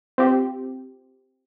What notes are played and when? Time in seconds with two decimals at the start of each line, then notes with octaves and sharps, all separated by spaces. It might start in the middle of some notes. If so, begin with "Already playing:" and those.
0.18 C4 F4 G4